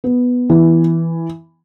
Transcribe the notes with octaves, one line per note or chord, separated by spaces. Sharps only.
B3
E3